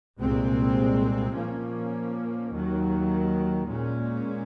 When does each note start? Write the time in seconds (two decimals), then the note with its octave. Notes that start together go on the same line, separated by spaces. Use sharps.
0.19 C2 A#2 G#3 C4
1.35 A#2 F3 A#3 C#4
2.50 D#2 D#3 F#3
3.66 A#2 G#3 C#4